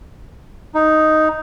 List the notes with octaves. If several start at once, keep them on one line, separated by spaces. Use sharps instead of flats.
D#4